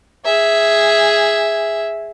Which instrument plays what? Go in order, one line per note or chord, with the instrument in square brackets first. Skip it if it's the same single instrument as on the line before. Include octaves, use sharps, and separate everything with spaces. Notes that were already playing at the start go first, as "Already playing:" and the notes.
[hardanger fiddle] G#4 E5